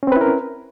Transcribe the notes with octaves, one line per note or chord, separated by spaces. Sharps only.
C4 C#4 E4 A#4 B4